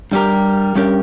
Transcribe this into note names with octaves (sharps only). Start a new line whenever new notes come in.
G2 G3 C#4 G4 A#4
G2 G3 C#4 G4 A#4